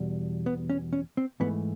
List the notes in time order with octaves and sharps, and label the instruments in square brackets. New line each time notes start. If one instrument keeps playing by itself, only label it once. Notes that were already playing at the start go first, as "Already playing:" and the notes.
Already playing: [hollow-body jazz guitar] E2 B2 G3
B3
C#4
C#4
C4
G#2 E3 A3 B3